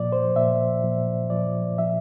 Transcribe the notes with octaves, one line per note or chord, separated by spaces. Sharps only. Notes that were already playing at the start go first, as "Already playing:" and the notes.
Already playing: A#2 F3 D5
C5
A#2 F3 E5
A#2 F3
A#2 F3 D5
A#2 F3 E5